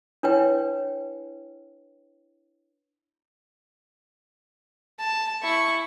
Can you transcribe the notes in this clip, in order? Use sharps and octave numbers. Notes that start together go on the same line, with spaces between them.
D4 E4 B4 C#5 G5
A5
E4 C#6